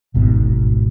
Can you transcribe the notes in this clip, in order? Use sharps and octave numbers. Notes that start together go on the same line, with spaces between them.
D1 G#1 G#2 B2